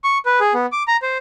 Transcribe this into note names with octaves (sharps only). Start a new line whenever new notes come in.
C#6
B4
G#4
B3
D6
A#5
C5